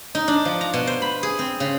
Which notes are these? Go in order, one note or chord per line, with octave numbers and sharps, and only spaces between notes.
D#4
D4
F3
A#5
B2
C5
B5
G#4
C4
C#3